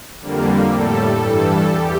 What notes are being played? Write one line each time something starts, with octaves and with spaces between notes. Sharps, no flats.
F2 D3 G3 A#3
A2 G3 A4
G2 E3 G3
E2 G4